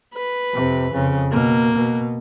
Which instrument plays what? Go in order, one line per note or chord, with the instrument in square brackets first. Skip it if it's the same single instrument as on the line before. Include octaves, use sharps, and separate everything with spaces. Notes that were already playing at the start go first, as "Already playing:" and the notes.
[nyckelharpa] B4
[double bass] F2 C3
F2 C#3
[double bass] B2 [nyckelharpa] A#3
[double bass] B2